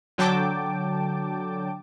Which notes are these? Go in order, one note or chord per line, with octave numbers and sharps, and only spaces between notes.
D3 F#3 G5 A5 D6